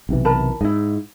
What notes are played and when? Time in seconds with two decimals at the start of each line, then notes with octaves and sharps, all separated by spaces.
0.09 B1 C3 E3
0.25 A#4 A5 B5
0.61 G#2 E4 D#5